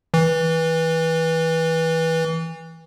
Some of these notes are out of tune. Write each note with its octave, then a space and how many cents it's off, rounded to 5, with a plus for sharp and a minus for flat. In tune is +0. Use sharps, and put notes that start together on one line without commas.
E3 -20